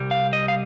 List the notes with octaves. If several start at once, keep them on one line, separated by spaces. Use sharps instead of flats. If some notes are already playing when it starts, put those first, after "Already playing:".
Already playing: C2 G3
F5
D#5
F5